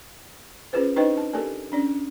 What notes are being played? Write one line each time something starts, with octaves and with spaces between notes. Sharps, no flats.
C#4 F4 G#4 B4 C5
D4 D#4 B4 C5 D#5 G5
A5
G4 A4 A#4 D5 G#5 A5
C#4 D4 D5